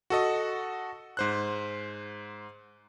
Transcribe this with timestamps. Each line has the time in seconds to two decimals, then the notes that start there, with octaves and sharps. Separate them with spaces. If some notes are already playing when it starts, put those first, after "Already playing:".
0.10 F#4 A4 D#5
1.17 G#2 C5 F#6